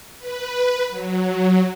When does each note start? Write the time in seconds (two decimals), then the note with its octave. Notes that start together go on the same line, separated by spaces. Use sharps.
0.18 B4
0.90 F#3